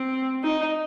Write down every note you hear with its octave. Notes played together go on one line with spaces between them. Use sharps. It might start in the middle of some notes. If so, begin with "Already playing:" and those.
Already playing: C4
D#4